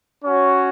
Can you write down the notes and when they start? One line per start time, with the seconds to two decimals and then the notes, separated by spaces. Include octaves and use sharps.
0.25 C#4 F#4 C#5